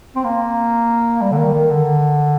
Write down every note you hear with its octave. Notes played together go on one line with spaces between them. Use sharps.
C4
A#3
G3
D3
D#3
D#3
D3